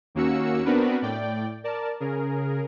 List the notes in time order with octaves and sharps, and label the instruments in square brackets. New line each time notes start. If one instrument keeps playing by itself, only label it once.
[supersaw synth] D#2 A#3 C#4 F#4 E6 C#7
B3 C4 D4 F#4 A#4 B4
A2 D5 G5
A#4 D5 A5
C#3 G#4 A#4